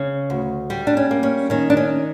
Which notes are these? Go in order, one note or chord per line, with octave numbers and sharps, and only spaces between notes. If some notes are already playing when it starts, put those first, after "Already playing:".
Already playing: C#3
D2
G3
D4
C#4
A#3
C#4
D#3 C#4
D4
C#4